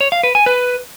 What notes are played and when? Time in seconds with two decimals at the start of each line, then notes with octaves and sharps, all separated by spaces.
0.01 C#5
0.12 F5
0.23 B4
0.35 G#5
0.46 B4